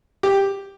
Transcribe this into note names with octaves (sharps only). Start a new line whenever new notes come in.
G4